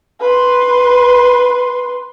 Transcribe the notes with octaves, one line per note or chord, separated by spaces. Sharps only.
B4 C6